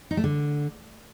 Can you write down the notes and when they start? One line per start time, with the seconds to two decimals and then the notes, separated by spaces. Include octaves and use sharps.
0.11 D#4
0.17 A3
0.24 D3